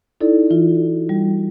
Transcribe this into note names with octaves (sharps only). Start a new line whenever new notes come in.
D#4 E4 A4 D5
E3 F4
F#4
G3